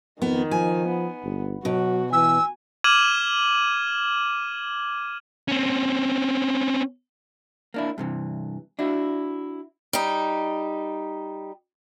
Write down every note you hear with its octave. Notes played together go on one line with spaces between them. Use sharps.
F2 D#3 B3
F3 G#5
B3
G1
B2 F#3 F#4
E3 G#5 E6
D6 F6 G#6 D#7 E7 F#7
C4 C#4
A#3 D4 E4
G2 C3 E3
D4 E4 F#4
G3 D#4